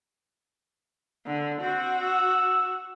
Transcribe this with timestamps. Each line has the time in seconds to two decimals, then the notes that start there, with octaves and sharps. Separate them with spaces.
1.26 D3
1.61 C4 F#4
2.02 E6